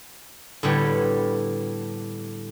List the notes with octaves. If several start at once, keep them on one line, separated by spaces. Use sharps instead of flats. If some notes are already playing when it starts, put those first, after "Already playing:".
A2 D3 G3 B3 C#5